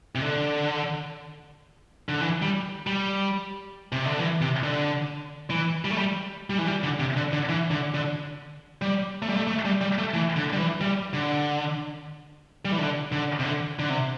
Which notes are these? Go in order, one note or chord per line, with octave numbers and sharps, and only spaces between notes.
C3
D3
D3
E3
G3
G3
C3
D3
E3
C3
D3
E3
G3
A3
G3
G3
E3
G3
D3
C3
D3
D3
E3
D3
D3
G3
A3
G3
A3
A3
G3
G3
A3
E3
D3
G3
E3
G3
D3
G3
E3
D3
D3
C3
D3
D3
C3